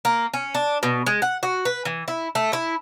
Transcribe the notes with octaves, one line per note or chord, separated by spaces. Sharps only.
A#3
C#4
D4
B2
G#3
F#5
F#4
B4
E3
E4
A3
E4